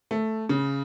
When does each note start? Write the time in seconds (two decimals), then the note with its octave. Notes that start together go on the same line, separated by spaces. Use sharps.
0.11 A3
0.49 C#3